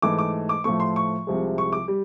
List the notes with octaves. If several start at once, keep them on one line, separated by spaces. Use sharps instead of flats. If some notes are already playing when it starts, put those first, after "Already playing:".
G#2 E3 A3 D6
D6
D6
A2 F3 A3 C#6
C6
C#6
C2 C3 F3 G#3
C#6
D6
G3